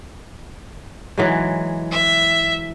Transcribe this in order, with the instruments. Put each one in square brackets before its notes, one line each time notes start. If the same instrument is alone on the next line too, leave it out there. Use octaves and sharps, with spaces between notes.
[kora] E3 F#3 G#3
[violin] E5